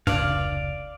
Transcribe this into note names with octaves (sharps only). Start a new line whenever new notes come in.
F1 C#2 G2 D5 F5